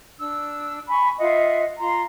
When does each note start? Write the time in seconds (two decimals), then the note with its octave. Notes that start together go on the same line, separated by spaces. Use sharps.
0.17 D4 E6
0.88 G#5 B5 C#6
1.18 F4 D#5 E5 F#5
1.78 F4 A#5 C6